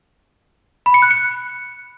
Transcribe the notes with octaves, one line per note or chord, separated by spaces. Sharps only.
B5
C#7
F#6
C#7